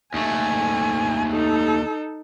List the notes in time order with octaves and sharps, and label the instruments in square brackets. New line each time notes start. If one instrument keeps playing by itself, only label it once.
[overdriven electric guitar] D#2 A3 [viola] G#5
[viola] D#4 A4